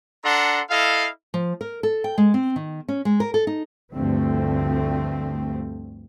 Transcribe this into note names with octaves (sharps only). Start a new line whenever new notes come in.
D4 A4 F#5 A#5 C6
E4 A4 D#5 F5
F3
A#4
A4
G5
G#3
C4
D#3
C#4
G#3
A#4
A4
D#4
D2 G2 D3 F3 A3 C4